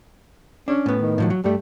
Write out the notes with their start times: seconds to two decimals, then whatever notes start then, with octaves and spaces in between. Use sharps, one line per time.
0.68 C#4 D4
0.86 A2 B3
1.01 D#3
1.18 A2 F3 F#3
1.30 F#3
1.44 G2 G3 A3